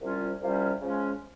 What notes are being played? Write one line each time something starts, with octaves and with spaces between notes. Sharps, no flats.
C2 C3 G3 C#4 F4
C2 C3 G3 C#4 F4
C#3 F3 G#3 C#4 F4